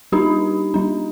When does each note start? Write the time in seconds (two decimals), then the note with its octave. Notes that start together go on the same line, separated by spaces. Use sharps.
0.12 G3 D4 D#4 G4
0.74 G3 D4